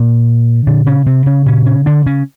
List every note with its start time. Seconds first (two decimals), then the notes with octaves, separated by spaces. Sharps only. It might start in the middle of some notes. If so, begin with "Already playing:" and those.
Already playing: A#2 A#3
0.67 A#2 D3 D4
0.86 C#3 C#4
1.06 C3 C4
1.26 C#3 C#4
1.46 A#2 C#3 C#4
1.66 C#3 C#4
1.86 D3 D4
2.06 C#3 C#4